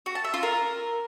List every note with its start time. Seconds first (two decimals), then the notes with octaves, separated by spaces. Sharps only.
0.06 F#4
0.15 A5
0.24 E5
0.34 F4
0.43 A#4